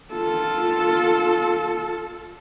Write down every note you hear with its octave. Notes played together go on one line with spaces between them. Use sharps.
F4 A4